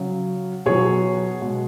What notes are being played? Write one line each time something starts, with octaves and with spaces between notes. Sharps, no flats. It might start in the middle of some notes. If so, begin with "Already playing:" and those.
Already playing: C#3 F#3
B2 F#3 G#4 C#5
B2 G#3